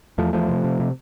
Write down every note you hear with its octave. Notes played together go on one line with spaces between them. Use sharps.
E2 F3 A3
E2 F3 A3
C3
C3
C3